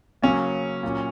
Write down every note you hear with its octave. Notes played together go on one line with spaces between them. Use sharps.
C#3 F#3 A#3 C#4
A#2 F#3 A#3